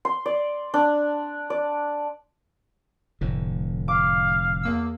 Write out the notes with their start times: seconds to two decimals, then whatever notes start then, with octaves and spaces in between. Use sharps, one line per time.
0.05 C6
0.26 D5
0.74 D4
1.50 D5
3.21 F1 A2 D3
3.88 F5 D6
4.63 E2 A#3 E6